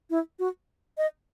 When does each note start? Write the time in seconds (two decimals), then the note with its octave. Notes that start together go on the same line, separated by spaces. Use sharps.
0.10 E4
0.39 F#4
0.98 D#5